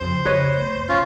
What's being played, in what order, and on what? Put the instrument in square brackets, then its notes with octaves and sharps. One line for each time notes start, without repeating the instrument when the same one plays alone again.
[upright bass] F2 C#3 [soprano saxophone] C5
[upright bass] C#3 [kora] B4 C#5 D#5
[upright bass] A3 B3
F#2
[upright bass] G#1 B2 [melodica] C#4 F4